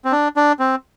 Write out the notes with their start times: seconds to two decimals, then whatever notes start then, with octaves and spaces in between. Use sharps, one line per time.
0.05 C4
0.12 D4
0.36 D4
0.59 C4